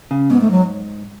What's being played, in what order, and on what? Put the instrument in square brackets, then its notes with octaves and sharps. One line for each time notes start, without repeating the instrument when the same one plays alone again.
[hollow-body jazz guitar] C#3
[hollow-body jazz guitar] G#2 [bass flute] B3
[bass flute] A3
F#3